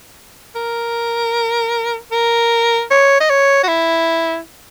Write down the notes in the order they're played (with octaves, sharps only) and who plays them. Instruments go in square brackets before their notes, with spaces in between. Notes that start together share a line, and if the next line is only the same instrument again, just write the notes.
[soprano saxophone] A#4
A#4
C#5
D#5
C#5
F#4
E4